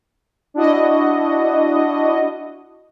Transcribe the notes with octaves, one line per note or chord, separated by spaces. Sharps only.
D4 E4 F#4 D#5